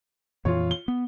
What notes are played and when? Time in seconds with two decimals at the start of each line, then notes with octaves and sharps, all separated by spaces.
0.45 F2 A#2 E3 F4 C#5
0.71 G7
0.88 B3